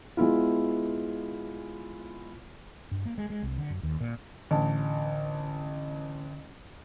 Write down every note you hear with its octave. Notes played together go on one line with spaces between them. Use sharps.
G#3 B3 E4 F4
G2
A#3
G#3
G#3
C2
D3
F#2
D#2
A#2
A1 D3 A5